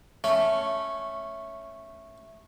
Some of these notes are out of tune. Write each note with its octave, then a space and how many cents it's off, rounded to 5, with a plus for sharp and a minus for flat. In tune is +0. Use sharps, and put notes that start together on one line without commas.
A3 +0 C#4 +0